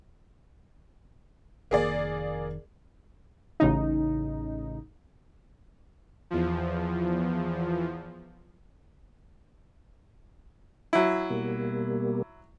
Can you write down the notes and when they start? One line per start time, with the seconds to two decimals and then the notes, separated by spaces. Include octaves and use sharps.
1.71 F1 D#3 A#3 G#4 D5
3.60 A1 C#3 D#4
6.30 E2 F3
10.93 F#3 E4
11.30 B2 G3 A#3